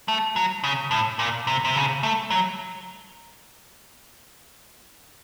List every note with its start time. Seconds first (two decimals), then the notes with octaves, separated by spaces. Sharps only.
0.08 A3
0.36 F#3
0.64 C#3
0.91 A2
1.19 A#2
1.47 C3
1.65 C3
1.76 C#3
2.03 A3
2.30 F#3